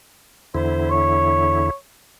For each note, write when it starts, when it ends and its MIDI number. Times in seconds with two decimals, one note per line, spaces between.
0.55 1.70 40
0.55 1.70 50
0.55 1.70 64
0.55 0.86 72
0.90 1.73 73